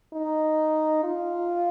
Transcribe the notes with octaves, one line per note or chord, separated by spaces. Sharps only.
D#4
F4